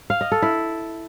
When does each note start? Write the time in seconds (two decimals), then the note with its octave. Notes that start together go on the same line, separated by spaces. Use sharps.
0.10 F5
0.21 D#5
0.32 A4
0.42 E4